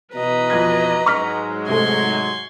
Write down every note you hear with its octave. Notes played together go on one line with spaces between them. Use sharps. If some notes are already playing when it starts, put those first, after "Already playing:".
B2 E3 B4 D#5 A#5
F2 G#6
G#2 F#3 G#3 C#6 F6 B6
C3 A3 C6 C#6 G#6